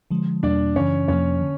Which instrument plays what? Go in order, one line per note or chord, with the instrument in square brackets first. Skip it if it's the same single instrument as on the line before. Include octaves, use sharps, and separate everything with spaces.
[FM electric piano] D3 F3 G#3
[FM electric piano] E2 B2 G3 A#3 [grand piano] D4 D5
[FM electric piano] F#2 C#3 E3 [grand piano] C#4 C#5
[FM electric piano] F2 C3 F3 A#3 [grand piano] C#4 C#5
[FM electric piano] D3